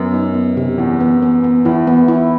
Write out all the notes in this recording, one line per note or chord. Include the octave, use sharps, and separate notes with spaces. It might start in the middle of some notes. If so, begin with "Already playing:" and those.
Already playing: F#2 B3
D#4
B3
C3
E2 B3
B3
B3
B3
E2 E4
B3
E4